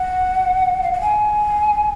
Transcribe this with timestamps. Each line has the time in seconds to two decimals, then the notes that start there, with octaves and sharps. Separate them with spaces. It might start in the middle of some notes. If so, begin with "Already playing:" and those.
Already playing: F#5
0.83 F5
0.92 F#5
1.01 G#5